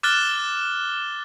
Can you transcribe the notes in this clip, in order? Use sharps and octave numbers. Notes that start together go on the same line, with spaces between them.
D6 F6 F#6 A6 E7 G7